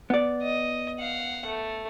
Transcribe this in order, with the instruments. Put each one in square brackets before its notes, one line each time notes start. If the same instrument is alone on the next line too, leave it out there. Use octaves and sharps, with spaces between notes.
[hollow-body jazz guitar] B3 D5
[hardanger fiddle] D#5
F5 F#5
A3